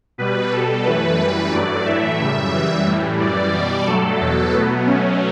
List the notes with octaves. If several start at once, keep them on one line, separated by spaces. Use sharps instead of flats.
B2 G3 B4
B2 G3 A4
F#2 E3 A3 B4
F#2 E3 G3 B4
G2 F#3 A3 D5
A2 E3 A3 E5
F#2 C#3 G3
F#2 E3 G3
A2 E3 G3
F#2 E3 G3 D5
B2 G3
G2 F#3 A3 A4
E2 B2 F#3
B2 F#3 A3 B3
B2 F#3 A3 C#4